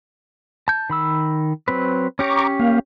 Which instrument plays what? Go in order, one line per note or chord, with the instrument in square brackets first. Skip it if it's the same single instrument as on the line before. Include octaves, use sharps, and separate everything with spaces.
[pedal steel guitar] A5 G6
D#3 B5 E6
F#3 C4 B4
[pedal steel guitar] C#4 G4 C#5 [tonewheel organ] A#5 C#6 D6
[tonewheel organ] A#3 F5